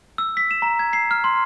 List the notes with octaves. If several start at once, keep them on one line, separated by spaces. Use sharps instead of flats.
E6
B6
E7
A#5
G#6
C7
F6
C6